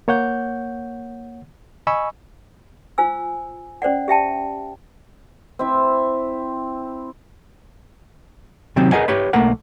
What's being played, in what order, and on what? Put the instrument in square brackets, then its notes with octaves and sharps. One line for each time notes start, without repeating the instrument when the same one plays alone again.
[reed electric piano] A#3 C#5 F#5 G6
D#5 G#5 B5 C#6 E6
[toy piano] F4 C5 G#5 E6
C#4 C5 D5 F#5
G4 E5 G5 A5
[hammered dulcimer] C4 E4 E5
[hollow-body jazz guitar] C3 D#3 F#3 C4 G4
G#4 A#4 B4 D#5 F#5 G#5
G4 B4 C#5 B5
B1 A3 A#3 A#4 F#5